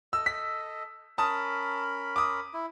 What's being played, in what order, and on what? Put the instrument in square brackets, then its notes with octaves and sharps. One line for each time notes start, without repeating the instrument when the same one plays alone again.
[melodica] A4 D#5 [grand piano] E6
[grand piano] B6
[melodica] C#4 A#4 B5 [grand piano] A5 D#6
[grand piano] D6 D#6
[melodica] E4